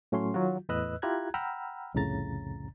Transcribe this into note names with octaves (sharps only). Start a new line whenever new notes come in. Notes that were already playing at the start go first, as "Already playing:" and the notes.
A2 F#3 A3 C#4 C#5 C6
D#3 F#3 F4 F#4
E2 A2 B4 D#5 E6 F#6
E4 F4 G4 A#5 F#6 G#6
F#5 G5 A#5 B5 E6 F6
C2 F2 A2 C#3 A#5 A6